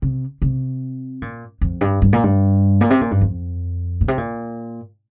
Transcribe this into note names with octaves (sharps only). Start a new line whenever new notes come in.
C3
C3
A#2
F2
G2
G2
A#2
G2
A#2
C3
A#2
G2
F2
A#2
C3
A#2